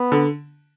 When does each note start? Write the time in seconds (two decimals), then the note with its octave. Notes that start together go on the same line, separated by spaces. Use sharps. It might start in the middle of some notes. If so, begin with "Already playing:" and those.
Already playing: B3
0.12 D3